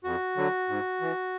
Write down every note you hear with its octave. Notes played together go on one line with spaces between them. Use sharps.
F2 F#4
D3 F#3
G#2
E3